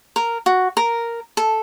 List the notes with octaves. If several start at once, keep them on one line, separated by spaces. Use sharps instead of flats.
A#4
F#4
A#4
A4